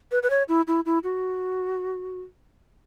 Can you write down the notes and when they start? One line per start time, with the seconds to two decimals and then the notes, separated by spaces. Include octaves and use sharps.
0.11 B4
0.23 B4
0.30 C#5
0.49 E4
0.68 E4
0.86 E4
1.04 F#4